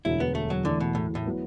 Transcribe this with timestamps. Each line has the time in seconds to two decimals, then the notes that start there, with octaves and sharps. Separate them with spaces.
0.05 E1 D2 D3 E4
0.20 B3
0.35 A3
0.50 F#3
0.65 E2 D3 E3 A3 E4
0.80 B2
0.95 A2
1.15 A2
1.26 F#3 B3 E4